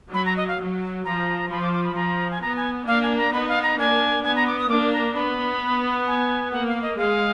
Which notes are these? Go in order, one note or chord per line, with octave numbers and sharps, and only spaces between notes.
F#3 B5
A#5
D#5
F5
F#3
F3 A#5
F3 B5
D6
D6
B5
F3 A#5
G#5
B3 A#5
G#5
A#3 D4 F5
G#5
A#5
B3 D#4 B5
F5
A#5
A#3 D4 G#5
B3 G#5
A#5
D6
D#6
A#3 D4 D6
A#5
B3 B5
G#5
A#3 F#5
F5
D#5
G#3 F5